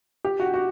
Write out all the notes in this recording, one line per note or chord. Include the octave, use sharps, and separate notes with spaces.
G4
F#4
F#4